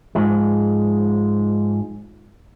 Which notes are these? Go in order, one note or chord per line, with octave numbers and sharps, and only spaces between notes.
G#2 F3 G#3